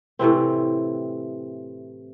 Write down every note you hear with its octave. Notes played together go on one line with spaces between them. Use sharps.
A2 C3 E3 C4